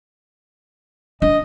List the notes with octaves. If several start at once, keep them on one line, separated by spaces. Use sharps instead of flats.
D4 D#5